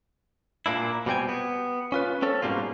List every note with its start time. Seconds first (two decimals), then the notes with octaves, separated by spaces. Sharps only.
0.66 A#2 A#3 D4 E4
1.06 B2 G3 C4 G5 G#5
1.29 B3
1.92 C#4 F4 B4
2.22 C4 C#4 A4
2.42 G#2 B2 G3 A#3 F4